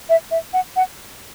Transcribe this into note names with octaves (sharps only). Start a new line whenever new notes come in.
E5
E5
F#5
F#5